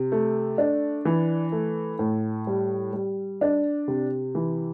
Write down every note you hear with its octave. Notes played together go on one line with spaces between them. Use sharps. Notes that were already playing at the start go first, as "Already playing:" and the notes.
Already playing: C3
A3
D4
E3
A3
A2
G3
G3
D4
C3
E3